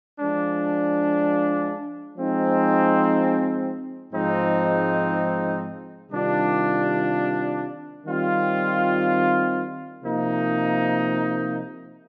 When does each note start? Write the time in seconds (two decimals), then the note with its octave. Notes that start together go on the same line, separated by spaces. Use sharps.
0.20 F3 G#3 D4
2.17 F3 G#3 C4 D#4
4.13 G#2 F3 G#3 C4 D#4
6.10 C3 D#3 G3 D4 F4
8.07 D#3 G3 C4 F4
10.03 C3 F3 A#3 D#4